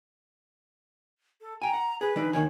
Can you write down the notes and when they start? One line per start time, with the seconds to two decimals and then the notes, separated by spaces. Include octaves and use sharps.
1.41 A4
1.62 G5 G#5 A#5
1.74 F#5
2.01 G#4 B4
2.16 E3 D4 D#4
2.33 D#2 D#3 C#5 G#5